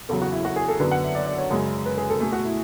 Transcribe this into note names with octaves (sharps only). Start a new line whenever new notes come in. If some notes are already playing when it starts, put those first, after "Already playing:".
E2 C#3 F#3 A4
F#4
E4
F#4
G#4
A4
F#2 D3 F#3 B3 B4
F#5
E5
D5
D5
C#5
F#2 C#3 G#3
B4
G#4
A4
B2 A3 G#4
F#4
E4